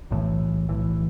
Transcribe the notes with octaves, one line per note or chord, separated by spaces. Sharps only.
B1 A2 E3
B1 A2 E3